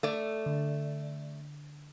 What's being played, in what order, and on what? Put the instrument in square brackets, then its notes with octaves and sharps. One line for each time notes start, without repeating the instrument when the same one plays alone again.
[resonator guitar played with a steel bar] A3 D5
[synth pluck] D3